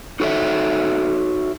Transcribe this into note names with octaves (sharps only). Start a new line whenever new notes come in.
D#4 F#4 A4 C#5 E5